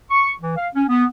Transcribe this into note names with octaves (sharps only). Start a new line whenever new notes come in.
C#6
E3
F5
C#4
B3